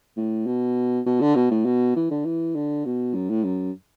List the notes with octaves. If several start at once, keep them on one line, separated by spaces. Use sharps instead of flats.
A2
B2
B2
D3
B2
A2
B2
E3
D3
E3
D3
B2
F#2
A2
F#2